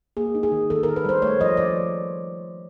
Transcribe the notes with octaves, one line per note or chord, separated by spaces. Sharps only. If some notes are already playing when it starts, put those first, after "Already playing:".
A#3 G#4
D#4
G#4
D#3
D#3 A4
A#4
D#3
B4
G3 C5
A3 C#5
F3 D#5
F3 D5